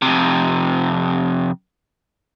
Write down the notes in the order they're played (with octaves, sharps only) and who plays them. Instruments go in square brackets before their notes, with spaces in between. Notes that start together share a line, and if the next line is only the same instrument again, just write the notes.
[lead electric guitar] F2 C3